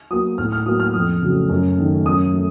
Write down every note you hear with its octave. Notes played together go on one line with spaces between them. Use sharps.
F#3 A#3 D#6
A2 F6
F6
F#3 A#3 D#6
F6
F2 D#6
C#3 F#3 A3
F#2
D#3 A3
F#2 D#6
A3